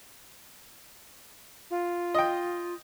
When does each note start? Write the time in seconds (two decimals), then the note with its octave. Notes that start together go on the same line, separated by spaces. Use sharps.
1.70 F4
2.15 D#5 G5